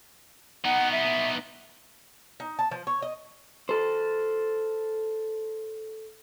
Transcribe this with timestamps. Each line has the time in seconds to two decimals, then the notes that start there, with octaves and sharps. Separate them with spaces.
0.65 B3 D#4 F#5
0.92 E5
2.40 D#4
2.59 A5
2.71 F3
2.87 C#5
3.02 D#5
3.69 A4 C5